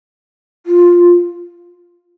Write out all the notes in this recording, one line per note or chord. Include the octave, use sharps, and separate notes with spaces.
F4